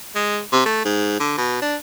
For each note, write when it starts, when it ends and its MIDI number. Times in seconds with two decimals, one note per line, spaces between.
0.16 0.40 56
0.53 0.61 48
0.66 0.83 57
0.85 1.16 44
1.20 1.33 50
1.38 1.60 47
1.62 1.76 62